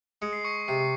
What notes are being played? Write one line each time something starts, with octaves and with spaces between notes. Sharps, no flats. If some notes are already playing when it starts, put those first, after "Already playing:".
G#3 C#7
C7
C#6 C#7
C3 C7